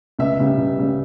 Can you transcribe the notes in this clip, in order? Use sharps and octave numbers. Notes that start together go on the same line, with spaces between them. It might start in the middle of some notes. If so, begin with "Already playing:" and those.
C#2 E5
C#3 G3
C#2
C#3 G3